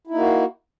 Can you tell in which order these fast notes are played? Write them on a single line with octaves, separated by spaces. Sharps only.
E4 D#4 A#3 F#4